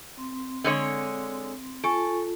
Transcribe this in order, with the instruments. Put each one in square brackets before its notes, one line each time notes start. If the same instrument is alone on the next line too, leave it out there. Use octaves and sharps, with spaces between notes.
[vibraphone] C4 C6
[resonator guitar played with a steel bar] D3 G#3 C#5
[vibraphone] F4 [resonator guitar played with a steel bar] A4 [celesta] G#5 C#6 D7